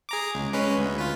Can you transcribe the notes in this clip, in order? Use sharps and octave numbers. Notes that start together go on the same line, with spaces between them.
G#4 A#5 D6
C#2
G#3 C#4 B4
D2
F4 B4